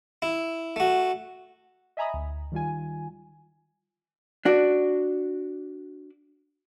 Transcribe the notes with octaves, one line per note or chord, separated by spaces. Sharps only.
E4
A3 F#4
D#5 E5 G#5 A#5 B5 D#6
D2
D#3 G3 F4 G#5
D4 F#4 D5